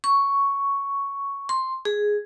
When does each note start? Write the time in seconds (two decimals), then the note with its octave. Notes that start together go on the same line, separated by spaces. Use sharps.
0.04 C#6
1.49 C6
1.85 G#4